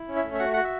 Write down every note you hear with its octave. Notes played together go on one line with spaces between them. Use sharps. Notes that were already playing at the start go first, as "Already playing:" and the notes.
Already playing: E4
C#4
E5
A3
E5
F#4 F#5
F#4 F#5
E5